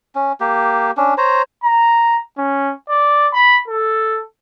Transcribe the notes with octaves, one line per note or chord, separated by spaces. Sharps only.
C#4
A#3 G4
C#4 D4
C5 C#5 A#5
A#5
C#4
D5
B5
A4